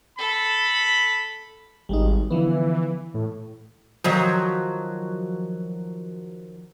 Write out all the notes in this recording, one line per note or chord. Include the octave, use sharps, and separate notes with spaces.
A4 B5
G#1 G3 G#3 D#4
D3 E3 F3 B3
A2
D#3 F3 F#3